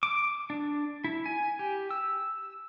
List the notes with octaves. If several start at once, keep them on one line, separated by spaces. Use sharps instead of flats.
D6
D4
E4
G#5
G4
E6